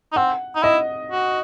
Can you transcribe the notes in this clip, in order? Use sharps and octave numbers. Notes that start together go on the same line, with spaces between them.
D#4
C4 F#5
D#4
E4 D#5
F#4